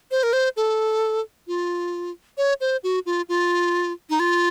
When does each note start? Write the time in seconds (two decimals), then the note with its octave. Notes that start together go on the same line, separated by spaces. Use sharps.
0.11 C5
0.23 A#4
0.33 C5
0.56 A4
1.47 F4
2.37 C#5
2.61 C5
2.83 F#4
3.06 F4
3.29 F4
4.10 D#4
4.20 F4